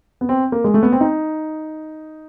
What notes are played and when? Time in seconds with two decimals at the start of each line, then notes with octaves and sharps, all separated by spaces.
0.21 B3
0.29 C4
0.52 A#3
0.64 G#3
0.74 A3
0.83 B3
0.92 C4
1.01 D#4